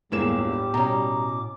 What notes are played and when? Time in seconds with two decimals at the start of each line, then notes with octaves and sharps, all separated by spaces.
0.12 G1 E2 A2 G3 G#3 A#3 D6 E7
0.74 B2 C#4 A#5